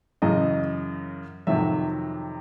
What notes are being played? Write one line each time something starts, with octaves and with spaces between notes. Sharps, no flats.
F#2 C#3 E3 D#5
F2 C3 D#3 F#3 E5